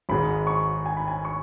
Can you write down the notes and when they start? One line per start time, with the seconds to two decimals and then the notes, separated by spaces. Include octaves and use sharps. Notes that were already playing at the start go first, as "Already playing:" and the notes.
0.09 G#1 G#2 G#3 B5
0.47 C#6
0.86 G#5
0.97 B5
1.08 G#5
1.25 C#6